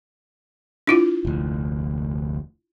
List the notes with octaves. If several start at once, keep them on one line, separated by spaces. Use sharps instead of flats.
D4 E4 F4
F1 D2